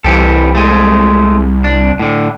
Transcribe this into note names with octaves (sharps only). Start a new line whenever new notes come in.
C2 E3 G4 A4
G#3 A3
D4
A2 D3